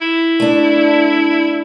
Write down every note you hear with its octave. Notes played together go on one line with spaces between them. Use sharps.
E4
A3 D4